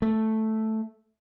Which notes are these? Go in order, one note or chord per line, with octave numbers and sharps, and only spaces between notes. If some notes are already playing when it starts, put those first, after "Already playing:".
A3